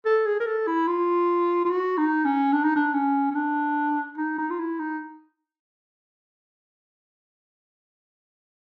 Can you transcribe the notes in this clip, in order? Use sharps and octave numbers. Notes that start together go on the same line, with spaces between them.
A4
G#4
A#4
A4
E4
F4
F4
F#4
D#4
C#4
D4
D#4
D4
C#4
C#4
D4
D#4
D#4
F4
E4
D#4